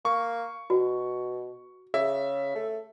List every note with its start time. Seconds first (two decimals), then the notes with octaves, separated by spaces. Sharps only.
0.05 A#3 C#6
0.70 B2 F#4
1.94 C#3 G#4 E5
2.55 A3